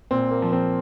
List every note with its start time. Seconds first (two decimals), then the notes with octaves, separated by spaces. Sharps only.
0.11 A#2 C4
0.31 A#3
0.42 F3
0.53 C4